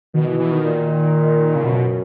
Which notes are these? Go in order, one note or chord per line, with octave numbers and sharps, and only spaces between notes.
B2 D#3
E3
E3
D#3
A#2
C#3
F#2 B2